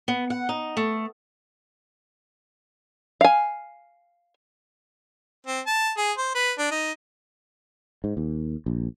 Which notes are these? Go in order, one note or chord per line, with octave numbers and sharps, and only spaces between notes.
B3
F#5
D#4
A3
F5 G#5
C4
A5
G#4
C5
B4
D4
D#4
G#2
D#2
A#1